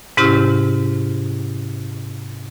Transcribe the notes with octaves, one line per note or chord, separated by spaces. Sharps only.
G#2 C3 C#4 E4 G4 F6